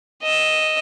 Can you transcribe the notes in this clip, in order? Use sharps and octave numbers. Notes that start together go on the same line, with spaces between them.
D#5 E6